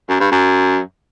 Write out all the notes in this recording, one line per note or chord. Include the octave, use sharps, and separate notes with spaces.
F#2
G2
F#2